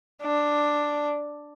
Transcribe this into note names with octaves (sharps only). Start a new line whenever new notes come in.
D4